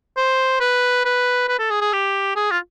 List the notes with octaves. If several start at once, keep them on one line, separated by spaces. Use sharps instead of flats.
C5
B4
B4
B4
A4
G#4
G#4
G4
G#4
F4